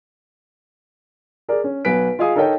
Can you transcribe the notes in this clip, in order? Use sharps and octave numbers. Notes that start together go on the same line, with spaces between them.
G#4 A#4 D5
C#4
B1 B3 B4 G#5 B6 D7
F4 G#4 D#5 F5 G#5 D#6
D#4 A4 A#4 C#5 D#5 G5